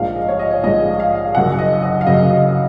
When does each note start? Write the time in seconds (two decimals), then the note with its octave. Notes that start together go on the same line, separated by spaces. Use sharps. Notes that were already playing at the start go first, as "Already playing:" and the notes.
Already playing: A#1 G#2 F3 G#3 F5
0.16 D#5
0.28 C#5
0.39 D#5
0.51 C#5
0.63 A#1 G#2 F3 G#3 D#5
1.00 F5
1.35 F#1 F#2 C#3 F#3 F#5
1.59 D#5
1.83 D#5
2.01 F5
2.06 F#1 F#2 C#3 F#3 D#5
2.31 D#5